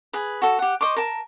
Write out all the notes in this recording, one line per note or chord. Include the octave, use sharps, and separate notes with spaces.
G#4 B4
F#4 A4
G4 F#5
C5 D#5 C#6 D6
A#4 A5